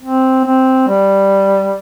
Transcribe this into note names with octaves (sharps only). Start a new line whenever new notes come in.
C4
C4
G3